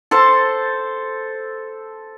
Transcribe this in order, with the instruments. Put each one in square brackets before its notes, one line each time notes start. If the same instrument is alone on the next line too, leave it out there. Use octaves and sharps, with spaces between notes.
[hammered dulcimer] A4 C5 A5